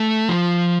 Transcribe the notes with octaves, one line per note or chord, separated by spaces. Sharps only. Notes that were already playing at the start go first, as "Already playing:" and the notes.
Already playing: A3
F3